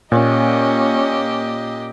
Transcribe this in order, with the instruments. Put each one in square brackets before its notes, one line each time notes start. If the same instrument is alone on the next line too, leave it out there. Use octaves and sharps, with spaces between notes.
[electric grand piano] A#2 [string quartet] A#3 G4 D#5 [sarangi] C#4